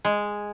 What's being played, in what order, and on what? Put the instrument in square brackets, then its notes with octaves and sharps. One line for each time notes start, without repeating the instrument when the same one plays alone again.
[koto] G#3